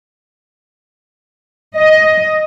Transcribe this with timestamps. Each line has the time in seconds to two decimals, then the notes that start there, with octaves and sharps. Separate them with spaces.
1.77 D#5